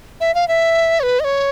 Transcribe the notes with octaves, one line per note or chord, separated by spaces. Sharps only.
E5
F5
E5
C#5
B4
D#5
C#5